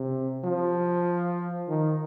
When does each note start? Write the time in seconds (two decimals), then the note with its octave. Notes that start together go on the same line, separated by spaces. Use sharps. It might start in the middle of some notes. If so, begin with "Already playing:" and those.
Already playing: C3
0.44 F3
1.68 D#3